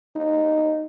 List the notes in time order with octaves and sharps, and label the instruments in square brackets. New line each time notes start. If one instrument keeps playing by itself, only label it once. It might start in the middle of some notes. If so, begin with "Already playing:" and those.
[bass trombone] D#4